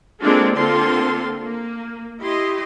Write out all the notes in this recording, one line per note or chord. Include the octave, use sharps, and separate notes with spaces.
G#3 A#3 C4 D4 F4 A4
D3 A#3 C4 F4 A4 C6
A#3
E4 G4 D#5 C6